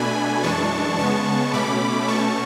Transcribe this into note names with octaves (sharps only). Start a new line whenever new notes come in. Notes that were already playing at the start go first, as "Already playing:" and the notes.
Already playing: B2 A3 D4 G#5 B5
F#2 E3 G#3 D4 A5 C#6
C#3 G#3 B3 A5 C#6
B2 A3 C#4 B5 D6
B2 A3 C#4 A5 C#6